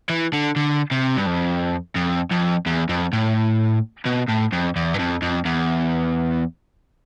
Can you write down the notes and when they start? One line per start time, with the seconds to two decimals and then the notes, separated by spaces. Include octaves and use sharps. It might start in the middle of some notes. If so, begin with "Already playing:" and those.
0.10 E3
0.33 D3
0.56 D3
0.91 C3
1.16 G2
1.26 F2
1.96 F2
2.31 F2
2.66 E2
2.89 F2
3.13 A2
4.06 B2
4.29 A2
4.53 F2
4.76 E2
4.94 G2
4.99 F2
5.22 F2
5.45 E2